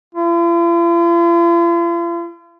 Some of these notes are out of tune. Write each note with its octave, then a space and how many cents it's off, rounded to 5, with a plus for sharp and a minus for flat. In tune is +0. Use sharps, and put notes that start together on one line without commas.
F4 -45